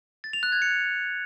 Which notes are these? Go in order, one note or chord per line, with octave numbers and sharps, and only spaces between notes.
A6
F7
F#6
G#6
C#7